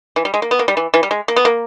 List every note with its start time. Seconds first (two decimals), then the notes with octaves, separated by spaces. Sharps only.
0.16 E3
0.25 G3
0.34 G#3
0.42 A#3
0.51 B3
0.59 A#3
0.68 G3
0.77 E3
0.94 E3
1.03 G3
1.11 G#3
1.28 A#3
1.36 B3
1.45 A#3